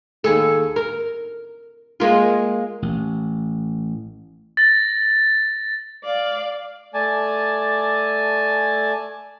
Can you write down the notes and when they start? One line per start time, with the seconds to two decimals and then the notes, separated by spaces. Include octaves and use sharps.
0.24 D#2 G#4 A4
0.76 A#4
2.00 G#3 A#3 F4
2.82 A1
4.57 A6 A#6
6.04 D5 F5
6.94 A3 D5 G#5 A5